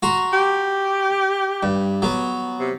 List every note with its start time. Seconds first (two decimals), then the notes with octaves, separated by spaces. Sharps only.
0.03 F#4 A#5 C6
0.32 G4
1.63 G2
2.02 F#3 B3
2.60 C3